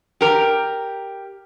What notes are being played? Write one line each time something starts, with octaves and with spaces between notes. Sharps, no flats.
G4 A#4